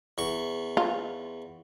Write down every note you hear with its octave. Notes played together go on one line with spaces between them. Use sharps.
E2 C#6
F4